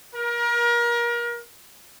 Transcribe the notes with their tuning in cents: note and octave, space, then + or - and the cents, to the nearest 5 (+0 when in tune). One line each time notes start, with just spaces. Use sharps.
A#4 +30